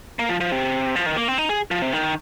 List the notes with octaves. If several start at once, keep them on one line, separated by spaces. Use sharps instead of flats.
A#3
F3
F3
C3
F3
D#3
A#3
C4
D#4
G#4
F3
C3
D#3